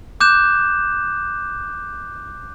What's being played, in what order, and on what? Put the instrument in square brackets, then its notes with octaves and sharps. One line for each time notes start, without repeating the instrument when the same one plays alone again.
[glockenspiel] D6 F#6 G6 E7